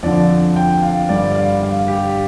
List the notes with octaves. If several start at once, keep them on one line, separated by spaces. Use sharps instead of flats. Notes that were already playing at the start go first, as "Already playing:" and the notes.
F2 D3 F3 D5
G5
F5
G2 D3 G3 D5
D5
F5
F5
G4